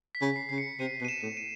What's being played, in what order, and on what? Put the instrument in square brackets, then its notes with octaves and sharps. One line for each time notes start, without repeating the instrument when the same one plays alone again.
[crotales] B6
[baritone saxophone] C#3
[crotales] C7
[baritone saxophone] C#3 [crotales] C7
[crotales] C#7
[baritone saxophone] C3 [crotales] D#7
[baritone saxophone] B2
[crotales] D#7
E7
[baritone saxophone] A2
[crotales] D#7